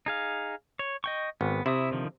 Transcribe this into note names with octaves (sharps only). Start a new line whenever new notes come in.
D#4 G#4 F5
C#5
D#5 G5 C#6
G#1 B3
C3 E4 E5 D#6
D3 D#3 F3